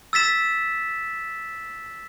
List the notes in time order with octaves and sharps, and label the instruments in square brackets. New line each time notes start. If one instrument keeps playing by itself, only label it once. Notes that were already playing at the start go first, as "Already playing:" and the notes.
[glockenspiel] E6 A6 B6 E7